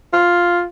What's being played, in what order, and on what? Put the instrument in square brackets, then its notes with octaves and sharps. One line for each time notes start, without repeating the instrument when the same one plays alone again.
[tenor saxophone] F4